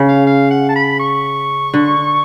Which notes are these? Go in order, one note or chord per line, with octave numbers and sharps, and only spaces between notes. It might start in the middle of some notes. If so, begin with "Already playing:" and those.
Already playing: C#3
F5
F5
F#5
A5
B5
C#6
D3